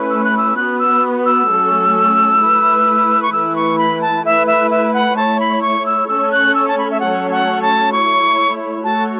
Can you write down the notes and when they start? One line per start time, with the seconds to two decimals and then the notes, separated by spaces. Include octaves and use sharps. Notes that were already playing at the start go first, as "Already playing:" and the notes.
Already playing: A3 C#4 E4 B4
0.10 E6
0.24 F#6
0.37 E6
0.56 B3 F#4 B4 F#6
0.79 E6
1.26 E6
1.48 F#3 A3 C#4 A4
2.40 A3 E4 B4
3.22 C#6
3.32 E3 A3 E4 B4 E6
3.56 C#6
3.78 B5
4.01 A5
4.24 A3 E4 B4 E5
4.47 E5
4.71 E5
4.93 F#5
5.16 A3 E4 C#5 A5
5.40 B5
5.62 C#6
5.86 E6
6.08 A3 C#4 A4 C#5 E6
6.32 F#6
6.55 E6
6.68 A5
6.78 B5
6.91 E5
7.00 F#3 A3 C#4 A4 C#5 F#5
7.31 F#5
7.62 A5
7.92 A3 E4 C#5 C#6
8.84 A3 F#4 A4 C#5 A5